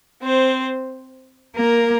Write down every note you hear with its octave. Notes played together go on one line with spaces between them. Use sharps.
C4 C5
A#3 A#4